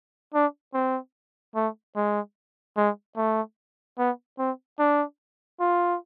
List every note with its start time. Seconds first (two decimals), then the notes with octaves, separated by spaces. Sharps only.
0.34 D4
0.74 C4
1.56 A3
1.96 G#3
2.77 G#3
3.17 A3
3.98 B3
4.39 C4
4.79 D4
5.60 F4